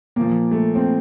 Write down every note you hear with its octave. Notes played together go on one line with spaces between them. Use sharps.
A#2 F3 A#3
A3
C4